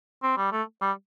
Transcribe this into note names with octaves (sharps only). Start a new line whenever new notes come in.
C4
G3
A3
G3